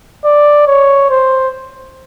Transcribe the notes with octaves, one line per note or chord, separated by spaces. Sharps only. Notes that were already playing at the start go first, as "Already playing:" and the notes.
D5
C#5
C5